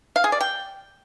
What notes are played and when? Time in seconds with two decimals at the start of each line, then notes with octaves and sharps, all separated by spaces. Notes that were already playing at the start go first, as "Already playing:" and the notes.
0.16 F5
0.24 G#4
0.32 D5
0.41 G5